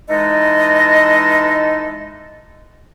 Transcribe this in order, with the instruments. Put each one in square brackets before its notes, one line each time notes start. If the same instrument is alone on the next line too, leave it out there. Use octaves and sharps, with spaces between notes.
[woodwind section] E3 G#3 D#4 A4 B4 D#5